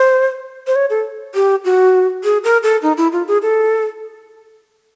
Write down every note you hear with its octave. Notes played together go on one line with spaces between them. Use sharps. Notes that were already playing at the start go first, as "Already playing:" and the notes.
Already playing: C5
C5
C#5
A4
G4
F#4
G#4
A#4
A4
D#4
E4
F4
G#4
A4